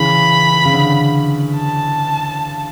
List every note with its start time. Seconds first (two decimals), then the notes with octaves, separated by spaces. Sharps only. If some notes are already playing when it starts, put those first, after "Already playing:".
Already playing: C#3 E3 B5
0.65 C#3
0.73 D3
1.56 A5